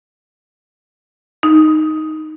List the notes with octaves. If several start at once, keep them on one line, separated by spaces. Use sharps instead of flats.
D#4